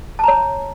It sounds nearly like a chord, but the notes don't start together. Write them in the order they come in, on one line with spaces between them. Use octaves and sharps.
A5 A#5 C#5